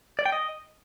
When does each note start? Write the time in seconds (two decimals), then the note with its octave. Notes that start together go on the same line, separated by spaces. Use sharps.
0.19 D5
0.26 G5
0.32 D#5